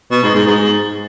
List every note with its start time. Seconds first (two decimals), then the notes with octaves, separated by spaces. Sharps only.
0.11 B2
0.23 G#2
0.35 G#2
0.46 G#2